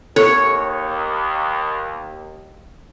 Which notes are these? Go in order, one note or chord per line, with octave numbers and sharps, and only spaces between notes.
D#2 A4 C#5